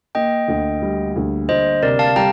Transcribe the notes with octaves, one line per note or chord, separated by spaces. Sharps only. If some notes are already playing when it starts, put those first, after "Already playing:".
A#3 D#5 G5
D2
G3
D2
D2 C5 D#5
C3 A#4 D5
F5 A5
G3 G5 A#5